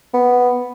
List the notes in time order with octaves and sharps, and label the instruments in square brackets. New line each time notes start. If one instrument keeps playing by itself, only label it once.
[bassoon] B3